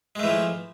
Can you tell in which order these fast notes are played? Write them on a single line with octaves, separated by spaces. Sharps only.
G#3 A3 E3 F3